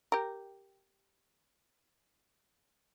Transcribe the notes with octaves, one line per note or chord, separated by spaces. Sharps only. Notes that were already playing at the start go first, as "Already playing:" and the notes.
G4 A#4